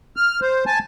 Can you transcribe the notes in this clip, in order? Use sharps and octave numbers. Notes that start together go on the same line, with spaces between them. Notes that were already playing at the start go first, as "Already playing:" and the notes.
F6
C5
G#5 A5